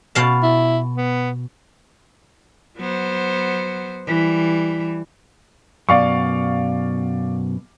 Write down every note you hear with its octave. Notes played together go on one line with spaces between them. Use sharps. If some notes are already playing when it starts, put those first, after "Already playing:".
B2 F5 A5
E4
B3
F#3 B3 C5
E3 G3
F#2 B2 D5 F5 C#6